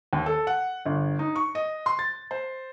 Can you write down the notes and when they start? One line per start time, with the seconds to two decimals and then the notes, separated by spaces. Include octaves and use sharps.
0.13 D#2
0.26 A4
0.47 F#5
0.86 G1
1.19 D#4
1.36 C#6
1.55 D#5
1.86 C6
1.99 A6
2.31 C5